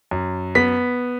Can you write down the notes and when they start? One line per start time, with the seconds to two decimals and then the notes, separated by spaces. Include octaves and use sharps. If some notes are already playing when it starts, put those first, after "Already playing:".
0.11 F#2
0.55 B3 B6